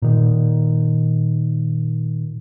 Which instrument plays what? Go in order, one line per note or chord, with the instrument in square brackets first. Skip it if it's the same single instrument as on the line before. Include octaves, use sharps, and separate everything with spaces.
[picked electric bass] A#2 D#3